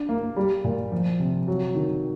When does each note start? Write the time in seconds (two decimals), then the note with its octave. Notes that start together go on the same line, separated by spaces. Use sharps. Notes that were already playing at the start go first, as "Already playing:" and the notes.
Already playing: D4
0.09 A#3
0.37 G3
0.64 A#2
0.92 F3
1.20 C3
1.48 F#3
1.75 D#3